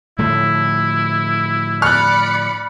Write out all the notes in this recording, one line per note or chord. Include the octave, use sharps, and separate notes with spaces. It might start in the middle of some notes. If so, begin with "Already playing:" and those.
A2 D3 F3 E4
D5 B5 F6 F#6 C#7